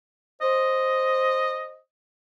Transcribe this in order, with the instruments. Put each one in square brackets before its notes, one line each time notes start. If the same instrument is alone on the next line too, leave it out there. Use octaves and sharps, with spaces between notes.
[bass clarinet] C5 [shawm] D#5